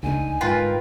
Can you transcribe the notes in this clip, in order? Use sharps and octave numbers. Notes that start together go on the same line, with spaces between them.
C#2 D3 A3 D#4 G#5
G#2 F4 A#4 B4 G5